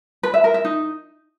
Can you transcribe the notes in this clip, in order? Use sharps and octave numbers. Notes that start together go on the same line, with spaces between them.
B4
E5
A#4
E5
D#4